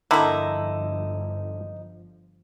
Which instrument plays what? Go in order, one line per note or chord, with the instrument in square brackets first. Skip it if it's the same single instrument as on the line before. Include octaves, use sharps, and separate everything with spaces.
[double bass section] G1 F3 [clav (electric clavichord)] D3 [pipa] A#3 E4 [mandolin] D#4 A#5